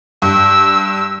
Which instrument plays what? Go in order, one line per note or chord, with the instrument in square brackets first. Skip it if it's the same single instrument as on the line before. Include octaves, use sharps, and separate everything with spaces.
[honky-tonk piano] G2 [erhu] E6